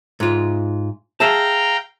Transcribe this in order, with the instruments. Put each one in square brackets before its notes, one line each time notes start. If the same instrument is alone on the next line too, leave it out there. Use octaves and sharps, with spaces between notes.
[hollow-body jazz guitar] G#2 F4
[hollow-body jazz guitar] G#4 E5 A5 [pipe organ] F5 G5 A#5